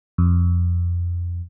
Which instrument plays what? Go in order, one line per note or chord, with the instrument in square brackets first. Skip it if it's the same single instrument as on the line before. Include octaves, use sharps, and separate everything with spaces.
[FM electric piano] F2